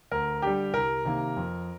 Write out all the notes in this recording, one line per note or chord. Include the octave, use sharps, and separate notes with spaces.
D2 A#4
D3 G3 G4
C2 A#4
C3 D#3 A#3
F2